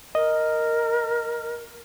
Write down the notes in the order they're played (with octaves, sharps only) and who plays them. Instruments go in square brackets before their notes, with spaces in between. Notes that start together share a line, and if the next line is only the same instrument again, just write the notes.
[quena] A#4 [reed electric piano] D#5